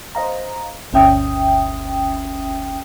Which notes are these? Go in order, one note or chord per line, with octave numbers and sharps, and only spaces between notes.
C5 D#5 F5 A#5
G1 D2 C#4 E5 G5 D#6